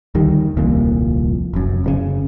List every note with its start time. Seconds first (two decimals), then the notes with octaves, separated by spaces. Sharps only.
0.15 D2 D#3 G3
0.57 D#1 C2 F2 A#2
1.54 F1 F#2
1.84 F#1 A#2 C#3